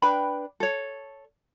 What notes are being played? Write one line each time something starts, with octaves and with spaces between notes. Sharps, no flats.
D4 B4 G5 B5
A4 C#5